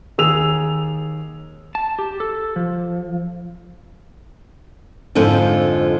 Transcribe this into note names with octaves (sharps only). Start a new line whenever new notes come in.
D#2 G#4 E6 F7
A5
G4
A4
F3
F2 G#2 D3 F3